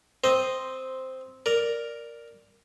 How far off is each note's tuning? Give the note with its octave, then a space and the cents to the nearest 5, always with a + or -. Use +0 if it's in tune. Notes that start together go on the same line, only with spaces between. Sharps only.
C4 -5 C5 +0 D#5 +0
A#4 +0 D5 +0